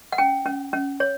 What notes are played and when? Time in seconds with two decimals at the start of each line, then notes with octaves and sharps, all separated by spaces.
0.13 F#5
0.18 C#4 G5
0.46 C#4
0.73 C#4
1.00 C#5